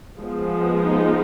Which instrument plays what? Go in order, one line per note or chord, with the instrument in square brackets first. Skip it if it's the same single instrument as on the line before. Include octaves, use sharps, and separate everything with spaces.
[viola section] F3 G#3 B3
D#4